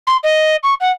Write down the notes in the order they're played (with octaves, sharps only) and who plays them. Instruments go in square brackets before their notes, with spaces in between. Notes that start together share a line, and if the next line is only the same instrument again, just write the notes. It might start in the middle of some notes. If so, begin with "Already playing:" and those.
[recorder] C6
D#5
C#6
F#5